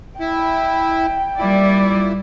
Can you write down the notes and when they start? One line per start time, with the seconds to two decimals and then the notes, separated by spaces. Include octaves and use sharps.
0.20 E4 G5
1.39 A#2 G3 E4 D5